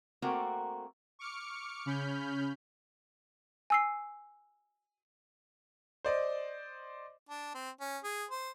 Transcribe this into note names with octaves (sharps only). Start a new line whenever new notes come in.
A3 A#3 C4 F#4 A#4
C#6 D6 F6 C#7
C#3 C#4 B5 F6 G6
G#5 E6 C7
C5 D5 D#5
D4
C4
C#4
G#4
C5